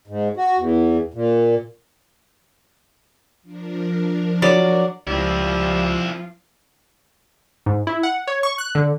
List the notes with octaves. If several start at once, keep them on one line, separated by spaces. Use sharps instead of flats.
G#2
F#4
E2
A#2
F3 D4 A#4
F#3 D5
C#2 F3 G3 C4 E4 F4
G#2
E4
F#5
C#5
C#6
F#6
D3